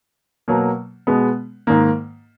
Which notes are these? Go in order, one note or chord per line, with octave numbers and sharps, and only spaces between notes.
B2 F#3 A#3
B2 G#3 B3
G#2 D#3 A#3